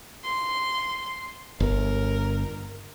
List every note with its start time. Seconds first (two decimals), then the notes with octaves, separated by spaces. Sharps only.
0.24 C6
1.60 G1 A#4